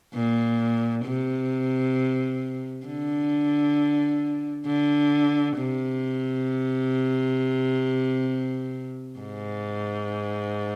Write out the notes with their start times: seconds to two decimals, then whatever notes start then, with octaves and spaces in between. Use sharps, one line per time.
0.14 A#2
1.05 C3
2.86 D3
4.67 D3
5.57 C3
9.20 G#2